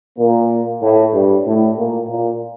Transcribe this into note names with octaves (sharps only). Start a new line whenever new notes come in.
A#2 A#3
A2 A3
G2 G3
A2 A3
A#2 A#3
A#2 A#3